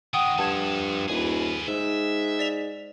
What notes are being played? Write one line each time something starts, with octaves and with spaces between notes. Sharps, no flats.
D#3 G#3 F#5 G5 D#6
G2 F3 A4 A5 G#6 E7
D#1 G#4 B4
G#2 E5
D5 B6 F7